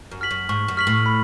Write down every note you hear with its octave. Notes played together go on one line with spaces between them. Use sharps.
F#2
F6 B6 F#7
F#2
G#2 C#6
F#2
F6 B6 F#7
A2
B5